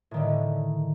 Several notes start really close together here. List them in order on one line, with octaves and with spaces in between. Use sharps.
A2 D#3 D3